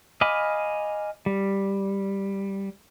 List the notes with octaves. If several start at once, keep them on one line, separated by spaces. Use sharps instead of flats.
D#5 F5 G#5 B5 D6
G3